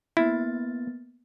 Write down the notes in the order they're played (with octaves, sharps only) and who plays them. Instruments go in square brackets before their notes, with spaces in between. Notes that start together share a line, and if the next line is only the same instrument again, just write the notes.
[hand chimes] A#3 B3 A6 [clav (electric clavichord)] E4